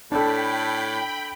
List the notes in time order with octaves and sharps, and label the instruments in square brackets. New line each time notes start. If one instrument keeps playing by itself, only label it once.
[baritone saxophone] A2 [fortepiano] D4 A4 [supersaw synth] G5 B5